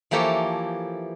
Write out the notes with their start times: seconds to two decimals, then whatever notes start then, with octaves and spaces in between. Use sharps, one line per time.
0.11 E3 F3 A#3 G4 A4 C#5